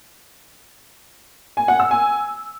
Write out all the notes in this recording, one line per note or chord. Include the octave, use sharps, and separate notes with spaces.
G#5
F#5
E6
G#5